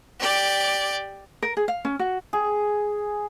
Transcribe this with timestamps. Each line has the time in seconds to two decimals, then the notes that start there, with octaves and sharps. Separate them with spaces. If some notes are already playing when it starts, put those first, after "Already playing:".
0.19 G4 D5
1.43 A#4
1.57 G#4
1.68 F5
1.85 C#4
1.99 F#4
2.33 G#4